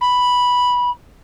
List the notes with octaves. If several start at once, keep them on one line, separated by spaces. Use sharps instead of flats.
B5